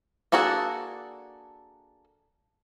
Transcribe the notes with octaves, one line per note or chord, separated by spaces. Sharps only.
A#3 D4 F#4 G#4 A4